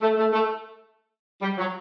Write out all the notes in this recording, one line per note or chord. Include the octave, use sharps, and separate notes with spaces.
A3
A3
A3
G3
F#3